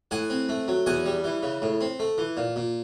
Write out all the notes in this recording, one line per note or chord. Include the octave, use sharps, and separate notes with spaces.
A2 F#5 G#5
C4
A3
F#3
E2 F#5 G#5
G3
E3
C#3
A2
C4
A3
E3
A#2
A#2